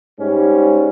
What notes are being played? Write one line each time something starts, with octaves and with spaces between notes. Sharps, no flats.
G#2 G3 C#4